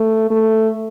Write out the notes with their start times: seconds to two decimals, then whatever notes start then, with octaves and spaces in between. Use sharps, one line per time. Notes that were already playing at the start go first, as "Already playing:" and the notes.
Already playing: A3
0.30 A3